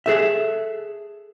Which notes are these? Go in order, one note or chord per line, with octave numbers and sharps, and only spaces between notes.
G#4 A4 E5